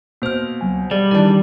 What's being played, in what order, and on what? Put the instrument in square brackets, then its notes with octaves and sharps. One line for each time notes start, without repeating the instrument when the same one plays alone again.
[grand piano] B2 F6 [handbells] A#3 C5
[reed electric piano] C#2 F#3 G#5
[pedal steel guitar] G3 [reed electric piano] G#4 [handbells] D5
[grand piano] D#3 E3 D4 [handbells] D5